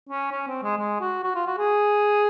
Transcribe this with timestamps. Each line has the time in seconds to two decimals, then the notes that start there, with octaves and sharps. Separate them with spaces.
0.09 C#4
0.31 C#4
0.47 C4
0.63 G#3
0.78 G#3
1.00 F#4
1.24 F#4
1.35 F4
1.46 F#4
1.58 G#4